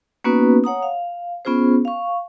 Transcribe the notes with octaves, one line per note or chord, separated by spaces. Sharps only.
A#3 B3 C#4 D#4 F#4 B4
C#5 F#5 A#5 D#6
F5
B3 C#4 F4 G#4 C5
F5 C#6